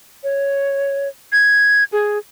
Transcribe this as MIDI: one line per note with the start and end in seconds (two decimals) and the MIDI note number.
0.23 1.08 73
1.32 1.84 92
1.92 2.18 68